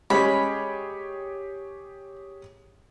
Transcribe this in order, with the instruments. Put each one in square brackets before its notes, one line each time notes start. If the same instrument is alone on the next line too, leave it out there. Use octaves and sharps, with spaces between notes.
[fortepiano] G#3 C#4 [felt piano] G4 G#4 C#5 [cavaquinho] B5